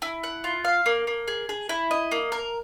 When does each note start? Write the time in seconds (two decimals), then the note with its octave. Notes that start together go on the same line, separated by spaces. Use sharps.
0.02 E4
0.24 F#5
0.44 F4
0.65 F5
0.86 A#3
1.07 A#3
1.28 G#4
1.49 G#4
1.69 E4
1.91 D#5
2.12 A#3
2.32 A#4